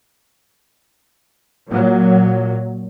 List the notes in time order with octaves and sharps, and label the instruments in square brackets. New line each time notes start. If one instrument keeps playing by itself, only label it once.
[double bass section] A#2 F#3